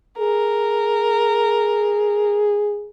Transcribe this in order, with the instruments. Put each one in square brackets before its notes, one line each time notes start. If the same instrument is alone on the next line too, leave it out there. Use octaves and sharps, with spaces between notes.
[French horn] G#4 [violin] A#4